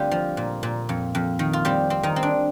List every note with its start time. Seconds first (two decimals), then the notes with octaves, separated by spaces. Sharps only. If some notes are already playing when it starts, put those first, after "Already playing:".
Already playing: D3 G3 A3 A#3 C4 F4 G4
0.11 F3
0.37 A#2
0.63 A#2
0.89 F2
1.15 F2
1.39 D#3
1.53 F4
1.65 G3 C4 G4
1.90 C4
2.03 D#3 D#4
2.16 C4
2.23 D4